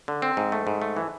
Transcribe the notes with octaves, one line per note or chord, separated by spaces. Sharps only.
D3
C4
G#2
A3
G#2
A3
E3